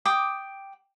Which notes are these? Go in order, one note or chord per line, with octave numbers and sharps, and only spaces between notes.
G5 D6 D#6